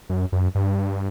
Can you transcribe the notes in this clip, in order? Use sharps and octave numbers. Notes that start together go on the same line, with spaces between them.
F#2
F#2
G2